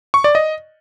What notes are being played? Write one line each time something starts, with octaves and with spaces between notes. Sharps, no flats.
C#6
D5
D#5